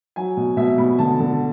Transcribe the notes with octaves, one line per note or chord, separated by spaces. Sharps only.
F#3 G#5
B2
B2 E5
B2 B5
D3 A5
D3